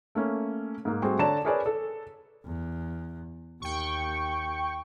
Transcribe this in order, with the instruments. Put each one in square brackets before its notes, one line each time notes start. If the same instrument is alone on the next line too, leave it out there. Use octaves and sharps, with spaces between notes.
[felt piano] A3 A#3 C#4
G#2 A#3
G3 A3 C4 F#4 G#4
D3 C#5 D5 A5 A#5 E7
G#4 A#4 B4 C#5 D5 G#5
A4
[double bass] E2
[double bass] D#2 [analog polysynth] G5 C#6